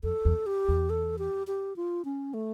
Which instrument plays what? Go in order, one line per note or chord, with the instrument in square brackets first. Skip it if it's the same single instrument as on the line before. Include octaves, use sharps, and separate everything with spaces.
[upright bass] F2 [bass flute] A4
[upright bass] E2
[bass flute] G4
[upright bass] E2
[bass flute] A4
G4
G4
F4
C#4
A3